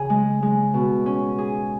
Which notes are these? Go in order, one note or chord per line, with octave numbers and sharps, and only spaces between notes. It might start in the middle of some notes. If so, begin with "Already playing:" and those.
Already playing: C#3 G#4
G#3
G#3
B2
C#4
G#4